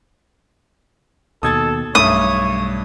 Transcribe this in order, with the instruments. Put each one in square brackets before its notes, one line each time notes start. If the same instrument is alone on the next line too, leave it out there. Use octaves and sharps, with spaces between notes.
[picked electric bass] D#2 B2 [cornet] A4 [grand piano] D#6 G#6 A6
[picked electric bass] B1 A3 [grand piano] G2 E5 [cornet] C#5 [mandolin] D#6